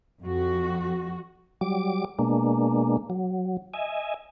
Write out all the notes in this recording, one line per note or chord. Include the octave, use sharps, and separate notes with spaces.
F2 F#4
F#3 G3 D6
B2 G#3 A#3 D4
F#3
D#5 E5 G#5